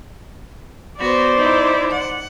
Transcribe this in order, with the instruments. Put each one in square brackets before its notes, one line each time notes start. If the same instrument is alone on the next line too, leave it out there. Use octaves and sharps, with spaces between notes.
[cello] B3 F#4 [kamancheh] C5 D5
[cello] D#4 E4
F#5